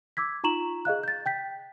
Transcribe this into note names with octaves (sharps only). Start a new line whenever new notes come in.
D6 E6 G#6 B6
D#4 F4 A#5 C#6 E7 F#7
G#4 D#5 F5 F#6
G6 A6
G5 G6 B6